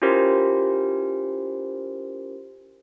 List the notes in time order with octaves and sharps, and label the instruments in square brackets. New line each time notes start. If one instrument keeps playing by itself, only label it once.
[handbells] C#4 E4 F4 G4 A#4 C5